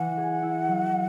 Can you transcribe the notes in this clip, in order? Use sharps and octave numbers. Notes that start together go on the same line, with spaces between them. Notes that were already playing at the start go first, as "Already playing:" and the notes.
Already playing: E3 E4 F#5
G#4
E4
F#3